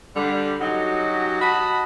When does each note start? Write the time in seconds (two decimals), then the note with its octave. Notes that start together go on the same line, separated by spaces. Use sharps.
0.16 D3 G3
0.61 F#3 C#4 D#4 F#4 G4
1.42 F#4 D#5 A5 B5